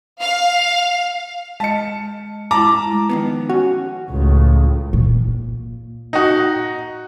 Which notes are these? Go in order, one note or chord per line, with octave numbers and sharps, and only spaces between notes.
F5
G#3 D#5 A5 C#7
G#3 E4 A5 A#5 D6
D#3 F3 B3
C#4 F#4
C#2 A2
A#2
D#4 F#4